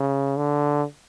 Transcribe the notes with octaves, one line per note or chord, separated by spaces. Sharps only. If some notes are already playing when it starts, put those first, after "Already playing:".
Already playing: C#3
D3